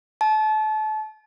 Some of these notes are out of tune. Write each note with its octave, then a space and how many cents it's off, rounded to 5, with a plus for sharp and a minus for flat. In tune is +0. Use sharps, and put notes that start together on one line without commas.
A5 -30